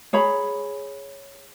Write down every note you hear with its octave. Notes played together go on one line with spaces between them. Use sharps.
G#4 C#5 A#5 B5